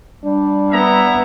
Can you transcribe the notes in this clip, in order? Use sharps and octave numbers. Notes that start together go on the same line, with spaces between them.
G3 D4
B3 E4 E5 A#5